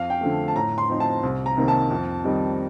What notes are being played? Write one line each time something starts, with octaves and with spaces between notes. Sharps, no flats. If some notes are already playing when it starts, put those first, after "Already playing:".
Already playing: F2 F5
G5
D3 F3 A3
A5
A2 A#5
C6
F3 C4 D#4
A5
C2
A#5
C3 D#3 A#3
A5
F2
D#3 G3 C4 D#4